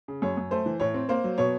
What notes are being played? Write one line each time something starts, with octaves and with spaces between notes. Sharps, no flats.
C#3
F#2 C#5
F#2
A3 C5
E3
A2 C#5
C4
A#3 C5
F#3
B2 C#5